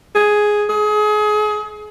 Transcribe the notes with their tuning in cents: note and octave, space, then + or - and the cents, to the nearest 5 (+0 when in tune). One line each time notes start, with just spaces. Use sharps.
G#4 +5
G#4 +30